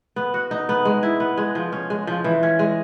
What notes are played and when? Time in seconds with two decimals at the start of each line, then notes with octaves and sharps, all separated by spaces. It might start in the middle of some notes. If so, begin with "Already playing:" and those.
0.16 B3
0.34 F#4
0.51 D#4
0.69 B3
0.85 G#3
1.03 E4
1.20 B3
1.37 G#3
1.55 F3
1.72 C#4
1.90 G#3
2.07 F3
2.24 E3
2.43 C#4
2.59 G#3